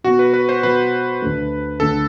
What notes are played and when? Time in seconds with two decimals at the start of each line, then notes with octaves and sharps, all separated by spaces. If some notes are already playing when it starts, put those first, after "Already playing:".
0.04 B2 F#3 B3 F#4
0.19 B4
0.34 B4
0.49 C5
0.63 B2 F#3 B3 B4
1.22 D2 D3 A3
1.80 D2 D3 A3 A4